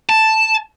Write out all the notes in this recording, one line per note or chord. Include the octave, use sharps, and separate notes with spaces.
A5